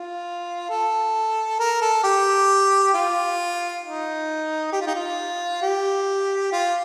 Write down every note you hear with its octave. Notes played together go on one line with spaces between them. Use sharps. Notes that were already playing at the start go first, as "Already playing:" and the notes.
Already playing: F4
A4
A#4
A4
G4
F4
D#4
G4
F4
D#4
F4
G4
F4